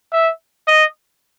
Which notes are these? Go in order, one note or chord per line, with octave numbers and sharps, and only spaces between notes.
E5
D#5